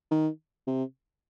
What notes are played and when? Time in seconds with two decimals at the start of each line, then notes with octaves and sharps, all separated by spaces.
0.11 D#3
0.67 C3